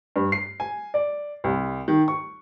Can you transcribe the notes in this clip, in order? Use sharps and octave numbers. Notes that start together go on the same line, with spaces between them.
G2
C7
G#5
D5
C2
D#3
C#6